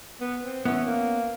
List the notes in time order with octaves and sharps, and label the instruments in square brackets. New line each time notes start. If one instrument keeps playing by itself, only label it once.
[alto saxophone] B3
C4
[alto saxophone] E3 [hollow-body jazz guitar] B3 C#4
[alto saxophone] A#3